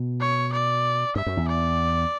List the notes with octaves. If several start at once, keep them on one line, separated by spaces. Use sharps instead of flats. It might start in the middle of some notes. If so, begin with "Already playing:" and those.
Already playing: B2
C#5
D5
G2 E5
F#2
E2
D5